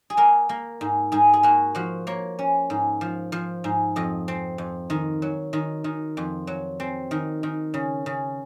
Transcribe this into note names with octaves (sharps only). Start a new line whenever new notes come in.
G#4
A#3 A#4
A#3
G#2
G#2 G#4
G#4
A#3 F#4
F3 F#4
A#3 C#5
C#4
G#2
F3
F3
G#2
F2 D#5
C4
F2
D#3
F#3
D#3
D#3
F2
F#3
C4
D#3
D#3
C#3
C#3